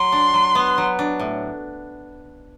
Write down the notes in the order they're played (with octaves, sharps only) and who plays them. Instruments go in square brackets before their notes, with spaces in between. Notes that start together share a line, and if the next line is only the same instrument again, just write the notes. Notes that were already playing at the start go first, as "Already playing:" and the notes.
Already playing: [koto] F#3 [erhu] C6
[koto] D4
F#3
B3
F#3
D4
A2